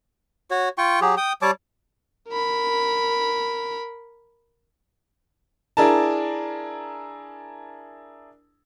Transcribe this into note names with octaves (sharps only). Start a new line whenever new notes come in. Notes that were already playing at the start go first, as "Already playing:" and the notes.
F#4 C#5
F4 G5 C#6
F#3 G4 G#4
G5 D#6
G3 C#5 A5 D6
A#4 B5
D4 E4 G#4 A#4 A5